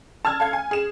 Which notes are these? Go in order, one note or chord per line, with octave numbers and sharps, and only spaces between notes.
A5 E6 F6 G#6
A4 F5 G#6
G#5
G#4 E7